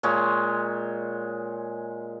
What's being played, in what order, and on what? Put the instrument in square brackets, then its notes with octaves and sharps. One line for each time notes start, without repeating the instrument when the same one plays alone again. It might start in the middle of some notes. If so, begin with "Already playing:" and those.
[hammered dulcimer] A#2 G#3 C#5